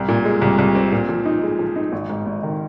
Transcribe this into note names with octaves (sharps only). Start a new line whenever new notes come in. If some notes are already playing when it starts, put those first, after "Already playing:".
Already playing: C2
A#2
G#3
C2
C2
C4
A#2
F3
D#4
G#3
F3
D#4
G#1
G#2
G#1
D#3